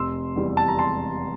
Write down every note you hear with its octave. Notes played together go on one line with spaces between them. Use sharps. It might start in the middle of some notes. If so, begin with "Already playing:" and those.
Already playing: F1 C6 E6
E2 E3 G3
A5
A#5
A5 C6